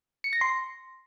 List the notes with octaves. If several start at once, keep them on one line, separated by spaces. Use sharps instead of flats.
C#7
A#6
C6